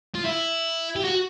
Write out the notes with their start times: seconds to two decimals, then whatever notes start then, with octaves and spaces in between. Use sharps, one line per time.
0.15 F4
0.25 E4
0.96 G4
1.05 F#4